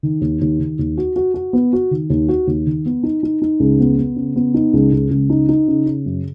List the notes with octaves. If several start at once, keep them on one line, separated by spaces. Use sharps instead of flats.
D#3
D#2
D#2
D#3
D#2
F#4
F#4
F#4
B3
F#4
D#3
D#2
F#4
D#2
D#3
B3
D#4
D#4
D#4
C#2
B3
B3
C#3
B3
D#4
C#2
C#2
C#2
D#4
D#4
C#3
C#3
F#2